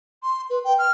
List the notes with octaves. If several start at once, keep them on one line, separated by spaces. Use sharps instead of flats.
C6
B4
G5
F6